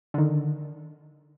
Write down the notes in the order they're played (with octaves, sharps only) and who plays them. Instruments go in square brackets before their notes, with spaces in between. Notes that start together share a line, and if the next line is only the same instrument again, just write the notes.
[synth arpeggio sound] D3 D#3